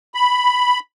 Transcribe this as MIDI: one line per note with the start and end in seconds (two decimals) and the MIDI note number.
0.15 0.80 83